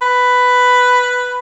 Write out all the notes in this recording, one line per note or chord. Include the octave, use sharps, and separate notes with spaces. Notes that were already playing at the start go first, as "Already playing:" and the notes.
B4